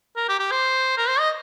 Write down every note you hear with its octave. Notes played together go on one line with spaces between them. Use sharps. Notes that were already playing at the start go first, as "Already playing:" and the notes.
A#4
G4
G4
C5
A#4
C5
D#5